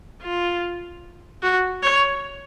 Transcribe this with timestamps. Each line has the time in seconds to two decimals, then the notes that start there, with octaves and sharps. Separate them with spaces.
0.22 F4
1.43 F#4
1.83 C#5